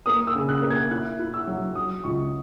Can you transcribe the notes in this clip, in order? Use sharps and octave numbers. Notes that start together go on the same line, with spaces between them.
A#3 D#6
E6
C#3
F#6
A#3
G#6
E4 F#6
E4
E6
F#3
F#3 D#6
C#2 C#6